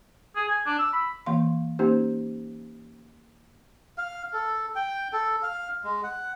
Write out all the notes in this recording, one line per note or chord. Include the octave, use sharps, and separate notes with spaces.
G#4
G#5
D4
E6
B5
E3 A#3 F5 C6
A#3 C#4 D#4 G4 C5
F5
A4
G5
A4
F5
G#3
F#5